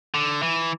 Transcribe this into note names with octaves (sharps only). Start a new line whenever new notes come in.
D3
E3